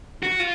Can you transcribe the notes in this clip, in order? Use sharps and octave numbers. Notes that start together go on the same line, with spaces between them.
F#4
F4